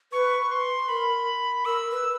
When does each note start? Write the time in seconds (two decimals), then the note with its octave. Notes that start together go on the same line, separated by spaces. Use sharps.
0.12 B4 C#6
0.51 C6
0.89 A#4 B5
1.65 A#4 E6
1.91 B4